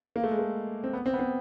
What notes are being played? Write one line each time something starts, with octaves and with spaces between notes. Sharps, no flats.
A#3
A3
G#3
A3
C4
B3
C4
B3
C4